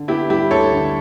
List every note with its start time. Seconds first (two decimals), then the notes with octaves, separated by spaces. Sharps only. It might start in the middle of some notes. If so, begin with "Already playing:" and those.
Already playing: D3
0.08 B3 E4 G4
0.30 G3 E4 G4
0.51 D2 A4 C#5
0.72 D3